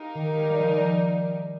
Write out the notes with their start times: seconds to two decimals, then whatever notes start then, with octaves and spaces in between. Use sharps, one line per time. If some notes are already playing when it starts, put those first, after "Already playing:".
Already playing: D#4 G4 A#4 F5
0.15 D#3
0.37 G#3
0.49 G3
0.60 F3
0.71 G3